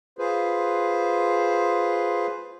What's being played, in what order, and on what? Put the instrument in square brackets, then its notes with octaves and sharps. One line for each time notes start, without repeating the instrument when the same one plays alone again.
[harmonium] F4 G#4 B4 C5